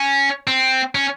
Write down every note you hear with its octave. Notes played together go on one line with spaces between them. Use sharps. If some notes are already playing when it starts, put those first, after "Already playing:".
Already playing: C#4
C4
C#4